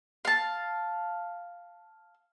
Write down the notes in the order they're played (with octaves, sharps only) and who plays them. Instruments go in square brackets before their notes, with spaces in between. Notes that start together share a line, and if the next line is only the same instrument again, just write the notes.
[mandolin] F5 A5